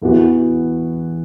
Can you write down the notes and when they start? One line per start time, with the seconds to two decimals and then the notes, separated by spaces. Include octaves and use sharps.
0.02 E2 E3 B3 F#4